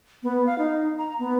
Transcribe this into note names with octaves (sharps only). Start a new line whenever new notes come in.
B3
F5
D#4
A#5
B3